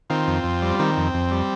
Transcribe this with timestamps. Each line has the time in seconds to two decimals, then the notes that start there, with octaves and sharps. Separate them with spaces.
0.10 D#3 C4 F4
0.27 F2
0.44 F2
0.62 G3
0.79 D#3 C4
0.97 F2
1.14 F2
1.31 G3